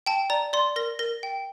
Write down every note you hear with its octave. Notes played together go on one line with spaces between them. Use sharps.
G5 A5
D5 A#5
D5 C6
A#4 A#6
A#4 A#6
G5